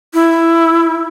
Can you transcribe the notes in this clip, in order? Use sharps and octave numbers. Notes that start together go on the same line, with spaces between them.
E4